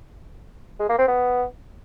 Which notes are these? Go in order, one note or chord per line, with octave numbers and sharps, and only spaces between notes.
G#3
A#3
C4
B3